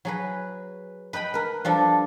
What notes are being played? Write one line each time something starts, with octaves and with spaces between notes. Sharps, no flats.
F#3 G#4 B4
B4 D#5 G5 B5
A#4 B4
F3 G3 D4 A4